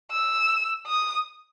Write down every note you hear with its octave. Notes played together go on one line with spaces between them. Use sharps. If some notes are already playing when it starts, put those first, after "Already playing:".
E6
D#6